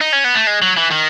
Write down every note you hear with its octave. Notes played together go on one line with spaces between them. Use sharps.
D#4
C#4
B3
A3
G#3
F#3
E3
D#3